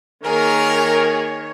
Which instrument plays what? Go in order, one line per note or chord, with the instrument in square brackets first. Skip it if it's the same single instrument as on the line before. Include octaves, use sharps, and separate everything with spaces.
[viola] D#3 C#5 [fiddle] A#3 G#4 [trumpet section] A#4